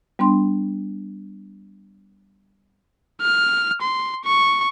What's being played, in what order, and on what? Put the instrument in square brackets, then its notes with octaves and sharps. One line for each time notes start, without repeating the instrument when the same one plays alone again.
[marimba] G3 B3 D4 C6
[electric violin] F6
C6
C#6